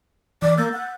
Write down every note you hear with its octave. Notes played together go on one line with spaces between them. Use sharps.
E3 D5 D6
A#3 E6 G6 A6
F#5